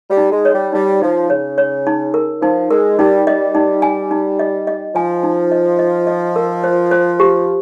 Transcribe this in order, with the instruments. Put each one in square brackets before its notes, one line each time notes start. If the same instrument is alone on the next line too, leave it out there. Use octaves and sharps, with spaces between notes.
[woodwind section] G3
[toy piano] D#4
[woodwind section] G#3
[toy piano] C#5
[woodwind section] G3
[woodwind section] G3 [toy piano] D#4
[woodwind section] F3 [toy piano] D#4
[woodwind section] C#3 [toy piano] C#5
[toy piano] C#5
D#4
A#4
[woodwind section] F3 [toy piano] D#4
[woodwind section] G#3 [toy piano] A#4
[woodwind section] G3 [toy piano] D#4
[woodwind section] G3 [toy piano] D#5
[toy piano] D#4
G#5
D#4
D#5
D#5
[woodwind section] F3 [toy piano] G#5
[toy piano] D#4
D#5
D#5
D#5
A#4
C5
C5
G4